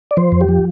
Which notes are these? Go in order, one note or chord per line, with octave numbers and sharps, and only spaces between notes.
D5
F3 C5
F2
G4
F3